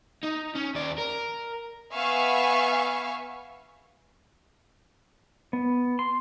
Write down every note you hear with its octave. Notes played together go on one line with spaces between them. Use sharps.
D#4
C#4
D#2 D5
A#4
B3 E5 F5 G#5 C#6
B3
C6